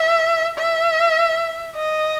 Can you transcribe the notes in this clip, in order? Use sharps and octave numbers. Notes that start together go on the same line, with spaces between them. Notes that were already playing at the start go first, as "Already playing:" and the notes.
Already playing: E5
E5
D#5